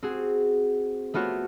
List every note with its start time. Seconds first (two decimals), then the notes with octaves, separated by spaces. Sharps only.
0.03 C4 F#4 G#4
1.14 A3 B3 F4 F#4 C#5